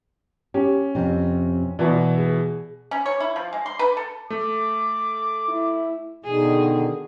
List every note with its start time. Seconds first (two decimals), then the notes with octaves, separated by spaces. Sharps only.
0.54 C#4 G4
0.95 F2 C3
1.79 B2 E3 D5
2.18 G#4
2.91 C#4
3.06 C#5
3.21 E4
3.36 F3
3.53 G#3
3.66 C6
3.79 B4
3.97 A4
4.30 A3 D6
5.48 E4
6.25 B2 D3 D#3 G#4